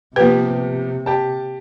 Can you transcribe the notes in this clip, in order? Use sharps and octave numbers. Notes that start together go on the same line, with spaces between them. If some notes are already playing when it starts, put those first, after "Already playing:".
C3 F3 A#3 B3 G4 B4
G4 A5